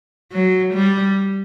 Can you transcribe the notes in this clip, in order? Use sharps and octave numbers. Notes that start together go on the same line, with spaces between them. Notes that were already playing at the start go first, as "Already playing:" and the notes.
F#3
G3